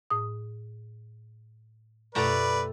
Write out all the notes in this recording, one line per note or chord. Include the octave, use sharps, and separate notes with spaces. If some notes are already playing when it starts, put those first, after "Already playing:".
A2 D#6
F#2 B2 A3 G4 B4 D5 A#5